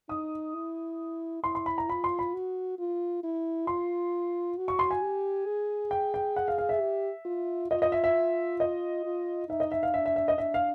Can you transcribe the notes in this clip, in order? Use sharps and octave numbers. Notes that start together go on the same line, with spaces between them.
D#4 D#6
E4
E4 C6
C6
B5
A#5
F4 B5
C6
B5
F#4
F4
E4
F4 C6
F#4
C#6
C6
G#5
G4
G#4
G5
G5
F#5
F5
F5
E5
G4
F4
F4 D#5
D#5
E5
E5
D#5
F4
D#4 E5
D#5
E5
F5
D4 E5
E5
E5
D#5
D4 E5
F5